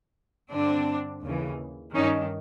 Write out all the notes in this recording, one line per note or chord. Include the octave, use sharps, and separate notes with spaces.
G2 D3 C4 D4
D#2 C#3 E3
G2 D#3 C#4 D#4